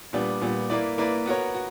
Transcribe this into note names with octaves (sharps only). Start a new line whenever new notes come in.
A#2 G3 B3 D4
A#2 G3 B3 D4
A#3 E4 B4 D5
A#3 E4 B4 D5
B3 F#4 A#4 C#5
F#4